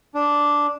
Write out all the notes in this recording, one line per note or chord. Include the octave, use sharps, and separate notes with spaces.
D4